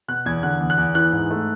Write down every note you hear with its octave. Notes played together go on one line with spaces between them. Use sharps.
B2 F#6
E2 G#6
D3 F#6
E2
F#6
E2
E3 F#6
G#2
A3